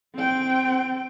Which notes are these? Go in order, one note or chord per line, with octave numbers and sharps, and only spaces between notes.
C4 G5